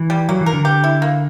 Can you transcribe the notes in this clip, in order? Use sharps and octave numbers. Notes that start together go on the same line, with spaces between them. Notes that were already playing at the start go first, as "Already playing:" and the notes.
Already playing: E3
G3
F#3 A#3
E3
A#4
D3
G4
E4
A#3